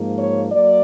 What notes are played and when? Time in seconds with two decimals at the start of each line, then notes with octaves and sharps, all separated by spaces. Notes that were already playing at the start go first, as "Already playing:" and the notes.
Already playing: G#2 F3 A#3
0.17 C#5
0.52 F#3 A#3 D5